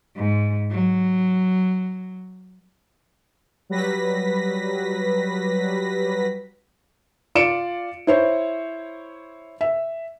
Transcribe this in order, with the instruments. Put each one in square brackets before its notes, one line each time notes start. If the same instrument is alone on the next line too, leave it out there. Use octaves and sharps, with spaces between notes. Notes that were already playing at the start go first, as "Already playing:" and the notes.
[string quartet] G#2
F#3
[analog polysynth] F#3 G3 B4 A#6 B6
[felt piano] F4 D5 C#7 D7 E7
E4 C5 C#5
E5